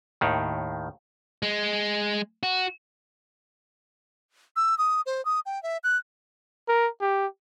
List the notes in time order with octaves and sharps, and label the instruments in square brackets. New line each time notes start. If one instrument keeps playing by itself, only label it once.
[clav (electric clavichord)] D#2 A2 D#3
[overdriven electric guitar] G#3
F#4
[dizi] E6
D#6
C5
D#6
G5
E5
F#6
[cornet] A#4
G4